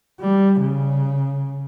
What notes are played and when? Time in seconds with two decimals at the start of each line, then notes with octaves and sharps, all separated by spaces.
0.20 G3
0.60 C#3